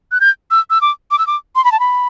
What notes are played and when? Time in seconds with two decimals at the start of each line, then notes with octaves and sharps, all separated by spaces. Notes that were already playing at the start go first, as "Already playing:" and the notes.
0.12 F#6
0.20 G6
0.51 E6
0.70 E6
0.81 D6
1.11 D6
1.18 E6
1.27 D6
1.55 C6
1.64 B5
1.72 A5
1.79 B5